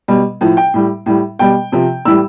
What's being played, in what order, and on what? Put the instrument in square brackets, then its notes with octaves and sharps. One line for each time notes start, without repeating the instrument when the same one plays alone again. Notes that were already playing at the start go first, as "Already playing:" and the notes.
[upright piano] B2 G3
A2 F3
G5
A2 G3
A2 G3
B2 G3 G5
C3 F3
A2 E3 G3 E6